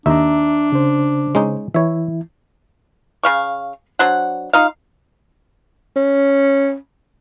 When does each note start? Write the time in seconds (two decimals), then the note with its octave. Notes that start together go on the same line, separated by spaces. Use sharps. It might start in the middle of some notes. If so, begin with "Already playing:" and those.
0.06 D#2 D4 D#4 E5 A#5
0.72 C#3 C5
1.35 G#3 C#4 D#4
1.74 E3 E4 C#5 E5
3.23 C#3 F5 C#6
3.99 F#3 D4 C5 F#5
4.53 D#4 F4 F5
5.96 C#4